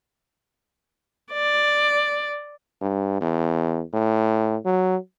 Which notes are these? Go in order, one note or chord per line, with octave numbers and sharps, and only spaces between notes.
D5
G2
E2
A2
F#3